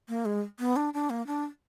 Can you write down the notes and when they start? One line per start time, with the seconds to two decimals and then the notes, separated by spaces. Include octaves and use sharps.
0.09 A#3
0.25 G#3
0.60 B3
0.76 D4
0.94 D4
1.10 A#3
1.27 D4